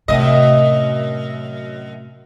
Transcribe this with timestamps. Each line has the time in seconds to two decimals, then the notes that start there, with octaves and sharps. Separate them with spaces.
0.08 F#2 A2 C3 D#5